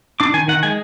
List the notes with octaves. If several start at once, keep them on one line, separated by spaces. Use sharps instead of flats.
D4 D6
D#3 G#5
D#3 F#5
G#3 G#5